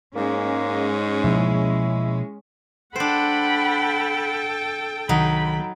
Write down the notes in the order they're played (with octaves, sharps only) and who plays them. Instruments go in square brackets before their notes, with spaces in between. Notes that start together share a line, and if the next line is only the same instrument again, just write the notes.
[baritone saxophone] G#2 [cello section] G#3 C#4 [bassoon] A#3
[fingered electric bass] B2 F3 A#3 [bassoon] E4
[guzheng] D4 C5 [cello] A4 G5 [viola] F#5 B5
[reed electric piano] C2 D#3 [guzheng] F#3 D#4 [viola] B5